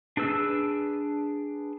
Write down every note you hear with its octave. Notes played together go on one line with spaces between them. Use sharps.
D4 G#4 B4 E6